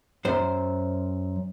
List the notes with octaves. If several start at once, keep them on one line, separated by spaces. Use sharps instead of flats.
F#2 C5